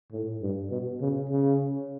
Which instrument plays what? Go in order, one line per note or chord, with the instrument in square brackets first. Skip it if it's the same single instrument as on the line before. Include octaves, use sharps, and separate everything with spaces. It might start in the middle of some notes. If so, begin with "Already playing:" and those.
[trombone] A2
G2
B2
C#3
C#3